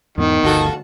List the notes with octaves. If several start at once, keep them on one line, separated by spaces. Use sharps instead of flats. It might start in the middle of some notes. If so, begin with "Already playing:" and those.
E2 G#2 D#3 B3
G1 D2 F4 F#4 A4